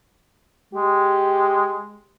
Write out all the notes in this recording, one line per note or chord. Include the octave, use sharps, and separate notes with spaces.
G#3 G4